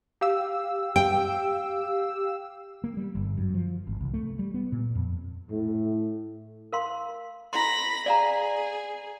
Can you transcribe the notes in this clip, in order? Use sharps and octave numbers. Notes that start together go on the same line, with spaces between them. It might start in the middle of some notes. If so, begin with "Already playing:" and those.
G4 F5 E6
G5
A#3
G3
G1
F#2
F3
G#1
C2
A3
G3
B3
A#2
F2
A2
A#4 F5 C6
E4 B5 C6 A#6
G#4 D5 F5 A#5